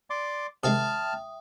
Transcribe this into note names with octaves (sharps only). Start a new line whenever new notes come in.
D5 C6 D6
C3 D#3 G#3 E5 G5 A5 D#6 F6